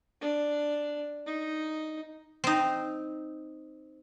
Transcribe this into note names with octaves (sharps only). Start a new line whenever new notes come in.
D4
D#4
C4 D#4